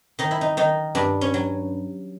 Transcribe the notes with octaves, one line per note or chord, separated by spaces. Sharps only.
D#3 D#4
E4
D#4
D#3 D#4
G2 D4
C#4
F#3